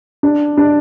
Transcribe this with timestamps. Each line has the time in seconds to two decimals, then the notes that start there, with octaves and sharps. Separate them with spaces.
0.23 D4
0.58 D4